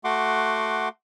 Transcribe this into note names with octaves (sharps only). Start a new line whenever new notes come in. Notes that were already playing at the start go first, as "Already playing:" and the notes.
A3 F#4 F#5 C6 D6